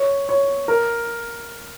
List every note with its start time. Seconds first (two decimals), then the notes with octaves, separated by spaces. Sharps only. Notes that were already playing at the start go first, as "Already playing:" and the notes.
Already playing: C#5
0.29 C#5
0.68 A#4